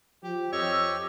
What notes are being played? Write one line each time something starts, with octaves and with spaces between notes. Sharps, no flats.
F3 G4
F2 G4 C#5 D#5 E6